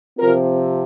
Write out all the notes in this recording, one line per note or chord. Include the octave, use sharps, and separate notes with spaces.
C3 F3 C4 F4 A#4